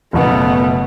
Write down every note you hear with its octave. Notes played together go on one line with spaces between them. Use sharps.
F#1 B2 A3 B3